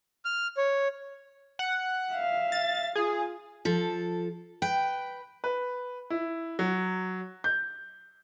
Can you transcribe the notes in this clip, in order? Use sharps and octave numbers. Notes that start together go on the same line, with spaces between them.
F6
C#5
F#5
E5 F5
A6
F4 G#4
F3 A4
B4 G5
B4
E4
F#3
G6